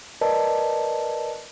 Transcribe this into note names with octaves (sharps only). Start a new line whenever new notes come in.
A#4 B4 D5 D#5 A5